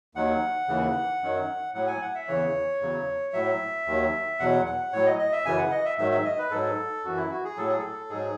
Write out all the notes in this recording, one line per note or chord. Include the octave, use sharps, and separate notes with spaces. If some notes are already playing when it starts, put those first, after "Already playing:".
D#2 D#3 F#3 F#5
D#2 C#3 E3
F#2 D#3 F#3
A2 F#3 F#5
G#5
F#5
E5
E2 C#3 E3 C#5
E2 C#3 F#3
A2 F#3 E5
D#2 D#3 F#3
E2 B2 F#3 F#5
F#5
A2 F#3 C#5
D#5
D#5
E5
F#2 C#3 E3 G#5
F#5
D#5
E5
G#2 D#3 F#3 E5
E5
D#5
B4
G#2 F#3 A4
F#2 E3 F#4
E4
F#4
G#4
A2 F#3 A4
G#4
A4
G#2 F#3 G#4